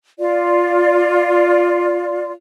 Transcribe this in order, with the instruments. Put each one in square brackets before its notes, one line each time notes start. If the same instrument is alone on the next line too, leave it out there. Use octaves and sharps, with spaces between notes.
[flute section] F4 D5